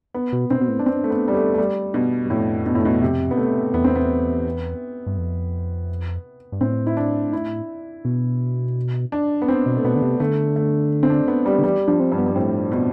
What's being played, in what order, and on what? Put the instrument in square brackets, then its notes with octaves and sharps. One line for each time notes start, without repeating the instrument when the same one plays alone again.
[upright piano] B3
[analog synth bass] B2
[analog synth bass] B2 [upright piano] C4
[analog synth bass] B2
A2
[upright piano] D4
C4
A3
B3
G3
A3
A3
G3
B2
[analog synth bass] G2
[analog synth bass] F2 [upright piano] A2
[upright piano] B2
A2
B2
C3
B3
A3
[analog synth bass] E2 [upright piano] B3
[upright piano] C4
B3
[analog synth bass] G2
F2
G2
[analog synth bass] A2 [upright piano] C4
[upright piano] E4
D4
E4
[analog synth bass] B2
[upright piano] D4
B3
C4
[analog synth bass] B2
[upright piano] A3
[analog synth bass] B2 [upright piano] B3
[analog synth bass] D3
C3
[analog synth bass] D3 [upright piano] A3
[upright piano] A3
C4
D4
B3
G3
[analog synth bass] D3
[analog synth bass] E3 [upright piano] G3
[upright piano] F3 [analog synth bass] D4
[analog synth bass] C4
[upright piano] G2
[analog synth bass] B3
[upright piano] G2
[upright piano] A2 [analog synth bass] C4
[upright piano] B2